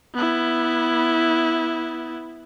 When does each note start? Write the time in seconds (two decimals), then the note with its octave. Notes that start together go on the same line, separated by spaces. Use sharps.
0.14 B3 E4